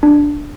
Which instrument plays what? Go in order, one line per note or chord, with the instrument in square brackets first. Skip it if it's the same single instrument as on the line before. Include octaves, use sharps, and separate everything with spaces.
[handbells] D4